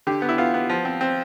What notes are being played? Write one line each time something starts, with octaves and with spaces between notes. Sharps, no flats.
D3 G4
B3
E4
B3 F4
B3
F3
C4
C4